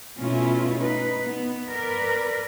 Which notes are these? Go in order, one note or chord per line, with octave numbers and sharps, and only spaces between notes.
B2 A3 C#4 E4 F4
D#4 B4
B3
A#4 B4 D5